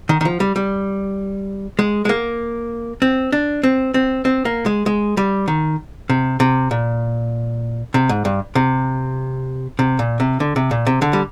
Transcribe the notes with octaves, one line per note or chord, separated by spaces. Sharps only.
D#3
D#3
F3
G3
G3
G#3
G#3
A#3
C4
D4
C4
C4
C4
A#3
G#3
G#3
G3
D#3
C3
C3
A#2
C3
G#2
G2
C3
C3
A#2
C3
D3
C3
A#2
C3
D3
G3